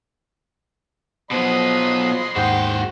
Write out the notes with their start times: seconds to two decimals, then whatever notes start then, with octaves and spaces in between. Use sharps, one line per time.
1.31 B2 F3 F#3 D#5 B5 C6 D#6
2.36 D#2 G#2 F#4 C5 F#5 G5